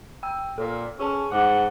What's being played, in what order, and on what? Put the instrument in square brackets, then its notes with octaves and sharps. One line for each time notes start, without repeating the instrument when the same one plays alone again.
[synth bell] G5 E6
[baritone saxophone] A#2 [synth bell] A4
[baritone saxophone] C#4 [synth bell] G#4 G#5 A5
[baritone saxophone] G#2 [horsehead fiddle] F#5 [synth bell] D6